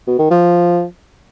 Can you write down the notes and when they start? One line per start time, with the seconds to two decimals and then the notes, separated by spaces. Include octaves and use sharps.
0.07 B2
0.19 D#3
0.31 F3